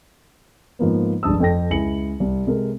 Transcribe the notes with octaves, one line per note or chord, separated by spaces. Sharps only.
G#2 F3 A#3 B3
F1 C#2 G2 A5 D#6 E6
F2 A4 G5 A#6
C#2 E4 G#5 C#7 F#7
C2
C3 G#3 A4 A#4